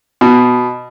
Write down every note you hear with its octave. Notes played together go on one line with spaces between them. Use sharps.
B2